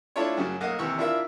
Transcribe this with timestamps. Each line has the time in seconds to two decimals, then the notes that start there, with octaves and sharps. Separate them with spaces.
0.16 A3 D4 E4 F4 C#5
0.37 F#2 C#3 F#3
0.61 B1 A#3 D#5 F5 F#5 D#6
0.78 D#2 C3 E3 C#6 E6
0.98 D4 E4 F4 A#4 E5